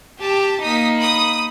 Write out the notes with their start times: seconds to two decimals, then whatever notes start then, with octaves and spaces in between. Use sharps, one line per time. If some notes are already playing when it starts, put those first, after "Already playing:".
0.20 G4 A5
0.63 A#3 D#4 D#6 B6
0.98 B5 D#6